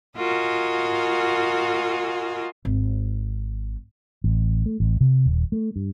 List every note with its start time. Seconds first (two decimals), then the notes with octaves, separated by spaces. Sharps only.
0.17 F4 F#4 A#4 D#5 G#5
2.65 G#1
4.24 A1
4.66 A3
4.80 A1
5.01 C3
5.26 D#1
5.52 A3
5.76 G2